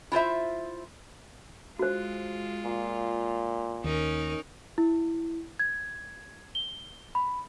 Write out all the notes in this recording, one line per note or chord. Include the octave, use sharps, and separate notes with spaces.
E4 F4 C5 E5
G#3 F4 F#4 C5
A#2
D#2 C#4 D#4 A#4
E4
G#6
G7
B5